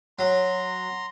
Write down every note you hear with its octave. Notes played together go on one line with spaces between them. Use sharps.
F#3 A#5 C6